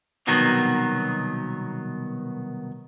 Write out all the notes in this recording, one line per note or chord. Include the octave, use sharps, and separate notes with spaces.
C2 B2 D#3 F#3 B3